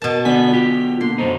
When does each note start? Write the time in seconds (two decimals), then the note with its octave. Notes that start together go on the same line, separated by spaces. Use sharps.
0.02 B2 A#4 A5
0.25 D3 B3 A4 D5 G#5 B6
0.51 B1 F4 G4
1.01 D3 A#3 C6
1.18 F#2 B2 D#4 C5